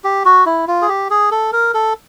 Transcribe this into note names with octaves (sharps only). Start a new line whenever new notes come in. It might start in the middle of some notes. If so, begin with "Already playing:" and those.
G4
F#4
E4
F4
G#4
G4
G#4
A4
A#4
A4